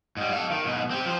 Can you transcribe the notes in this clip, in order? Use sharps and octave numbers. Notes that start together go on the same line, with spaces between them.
G#2 G3
A4 F5
D#3
G#2 B2
C4 G4
F3 C5